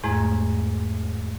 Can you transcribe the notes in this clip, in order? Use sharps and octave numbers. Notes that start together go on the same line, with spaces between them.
E2 G#2 G#3 A3 A#5 G#6